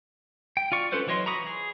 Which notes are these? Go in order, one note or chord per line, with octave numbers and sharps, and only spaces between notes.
G5
F4 D5 C#6
C#4 F4 A4 B4 C5
E3 F#3 C#5 D#5 C6
A#5 B5 C#6 D#6
G#4